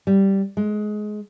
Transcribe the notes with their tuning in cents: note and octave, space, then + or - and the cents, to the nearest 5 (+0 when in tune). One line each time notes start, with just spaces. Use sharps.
G3 -5
G#3 +20